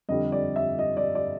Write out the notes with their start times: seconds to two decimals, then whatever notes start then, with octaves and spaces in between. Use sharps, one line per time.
0.09 F2 D3 G3 D#5
0.32 D5
0.56 E5
0.79 D#5
0.97 D5
1.15 D5